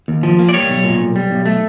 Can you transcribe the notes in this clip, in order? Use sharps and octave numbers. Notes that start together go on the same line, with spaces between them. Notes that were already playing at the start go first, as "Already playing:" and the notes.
D#2
F3
A#3
D5
G3 C#5
B1
A#2
B1
G3
B1
A3